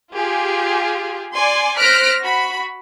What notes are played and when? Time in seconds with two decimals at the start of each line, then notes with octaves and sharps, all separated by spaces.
0.12 F4 G4 G#4
1.35 D5 G#5 C6
1.78 C5 F6 F#6 A#6 B6 D7
2.23 F#4 B5